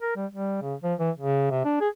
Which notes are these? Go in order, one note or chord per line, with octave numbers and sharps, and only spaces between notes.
A#4
G3
G3
C#3
F3
E3
C#3
C3
D4
G#4